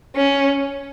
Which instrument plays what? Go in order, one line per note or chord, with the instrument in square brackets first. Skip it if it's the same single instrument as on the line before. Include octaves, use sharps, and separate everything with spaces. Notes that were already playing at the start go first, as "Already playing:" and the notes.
[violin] C#4